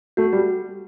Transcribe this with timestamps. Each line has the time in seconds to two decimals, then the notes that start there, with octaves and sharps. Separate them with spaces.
0.17 A3 F#4
0.33 G3